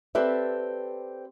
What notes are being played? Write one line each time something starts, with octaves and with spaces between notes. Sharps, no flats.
C4 G4 A4 B4 D5 E5